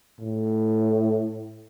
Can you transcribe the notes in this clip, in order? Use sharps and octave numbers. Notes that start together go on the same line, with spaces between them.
A2